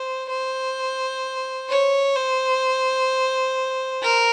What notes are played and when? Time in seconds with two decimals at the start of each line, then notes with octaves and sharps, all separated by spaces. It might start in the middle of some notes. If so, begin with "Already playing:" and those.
Already playing: C5
0.30 C5
1.69 C#5
2.16 C5
4.03 A#4